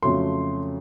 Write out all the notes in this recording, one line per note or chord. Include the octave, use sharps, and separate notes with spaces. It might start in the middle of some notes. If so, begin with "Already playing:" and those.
F2 C#3 F#3 A3 C6